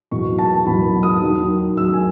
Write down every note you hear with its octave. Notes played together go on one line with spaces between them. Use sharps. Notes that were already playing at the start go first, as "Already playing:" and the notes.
E2 B2 F#3 C#6
A5
E2 B2 F#3 B5
D#6
D#2 D#3 F#3
D#2 D#3 F#3 E6
G#5